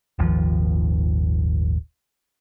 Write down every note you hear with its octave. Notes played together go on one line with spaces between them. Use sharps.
D#1 G#1 D#2 F3